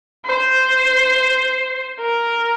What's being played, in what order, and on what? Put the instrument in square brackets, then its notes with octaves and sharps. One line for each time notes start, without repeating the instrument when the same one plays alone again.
[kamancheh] C5
A#4